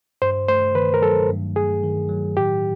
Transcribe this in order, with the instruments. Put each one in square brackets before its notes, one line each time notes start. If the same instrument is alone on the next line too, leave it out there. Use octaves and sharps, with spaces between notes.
[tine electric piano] G2 [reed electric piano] C5
[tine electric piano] A3 [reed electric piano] C5
[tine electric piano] D#3 [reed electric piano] B4
[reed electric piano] A#4
[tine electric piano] F#3 [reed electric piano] A4
[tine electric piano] G2
[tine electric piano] A3 [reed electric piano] G#4
[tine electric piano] D#3
F#3
[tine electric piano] A2 [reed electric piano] G4